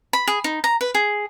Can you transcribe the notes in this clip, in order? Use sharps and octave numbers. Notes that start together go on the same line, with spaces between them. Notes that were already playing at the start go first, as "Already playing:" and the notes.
B5
G#4
D#4
A#5
B4
G#4